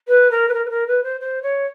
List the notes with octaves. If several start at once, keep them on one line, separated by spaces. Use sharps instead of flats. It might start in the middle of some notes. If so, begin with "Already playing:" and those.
B4
A#4
B4
A#4
B4
A#4
B4
C5
C5
C#5